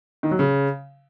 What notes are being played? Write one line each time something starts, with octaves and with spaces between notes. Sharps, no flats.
D#3
F#3
C#3